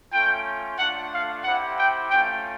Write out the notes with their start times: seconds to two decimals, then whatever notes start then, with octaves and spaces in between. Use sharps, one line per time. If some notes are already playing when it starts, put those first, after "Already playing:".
0.12 A3 C#4 F4 G5
0.78 A3 D4 F4 F#5
1.12 F5
1.44 C4 E4 G4 F#5
1.78 G5
2.10 A3 C#4 F4 G5